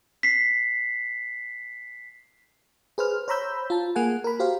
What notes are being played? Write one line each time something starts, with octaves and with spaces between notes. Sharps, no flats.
B6 C7
G#4 B4 C5 F6
C5 C#5 A#5 B5 E6 G6
F4 A5
A#3 G#4 F#5 G#5
A#4 B5
F#4 G4 C5 F5